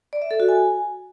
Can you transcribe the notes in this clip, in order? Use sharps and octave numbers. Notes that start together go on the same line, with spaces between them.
D5
E5
A4
F#4
G#5